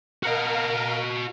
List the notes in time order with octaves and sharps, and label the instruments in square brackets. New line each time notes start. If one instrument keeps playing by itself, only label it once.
[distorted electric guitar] F#4 D#5 [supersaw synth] A#4 F5